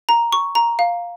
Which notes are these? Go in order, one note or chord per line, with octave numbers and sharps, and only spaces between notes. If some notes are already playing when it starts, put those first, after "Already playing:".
A#5
C#6
A#5
F5